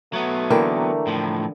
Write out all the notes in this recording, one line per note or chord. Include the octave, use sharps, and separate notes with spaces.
F#3 A3 B3
D3 E3 A#3 A#4 G5 A#5
A2 F3